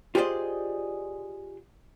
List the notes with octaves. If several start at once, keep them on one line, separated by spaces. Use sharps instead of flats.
F4 G4 G#4 C5 D5 D#5